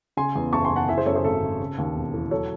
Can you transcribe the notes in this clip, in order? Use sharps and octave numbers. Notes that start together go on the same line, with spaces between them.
C#3 G#5 C6
E2
F#1 A5 C#6
G#5 C6
F#1
F#5 A5
E3 E5 G#5
G#4 C5
F#2 A4 C#5
G#4 C5
G#1 A4
G#1
C#3
D#2
E1
E3
F#3 A4 C#5